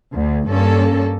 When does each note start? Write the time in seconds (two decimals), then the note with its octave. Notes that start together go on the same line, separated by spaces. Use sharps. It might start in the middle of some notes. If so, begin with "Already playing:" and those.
0.14 D2
0.48 G2 A#3 C#4 A4